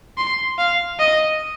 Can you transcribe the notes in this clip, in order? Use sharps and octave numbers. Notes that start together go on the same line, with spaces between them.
C6
F5
D#5